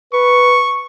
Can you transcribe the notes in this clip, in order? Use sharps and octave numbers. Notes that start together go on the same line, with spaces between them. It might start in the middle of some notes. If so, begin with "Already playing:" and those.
B4 C#6